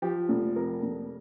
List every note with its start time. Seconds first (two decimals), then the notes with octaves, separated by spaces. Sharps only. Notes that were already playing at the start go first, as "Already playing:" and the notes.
0.02 F3 G4
0.29 F1
0.56 F2 A#4
0.83 F1